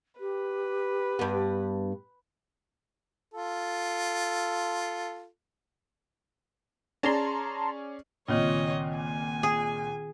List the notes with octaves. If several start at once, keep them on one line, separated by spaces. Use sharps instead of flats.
G4 B4
G2 B3
F4 A4
C#4 G#4 D5 A5 A#5 C6
C#2 A#2 D#3 C4 F4 C#5 D#5
G#5
G#4